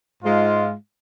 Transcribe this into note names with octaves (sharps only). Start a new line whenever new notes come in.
G#2 G#3 F4